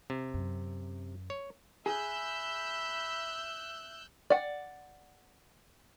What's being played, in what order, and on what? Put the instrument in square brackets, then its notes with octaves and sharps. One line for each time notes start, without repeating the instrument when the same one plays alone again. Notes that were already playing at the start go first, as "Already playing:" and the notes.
[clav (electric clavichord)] C3
[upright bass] F#2
[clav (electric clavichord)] C#5
[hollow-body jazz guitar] G#4 [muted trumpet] E5 [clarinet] B5 [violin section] E6 F#6 G6
[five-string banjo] D5 F#5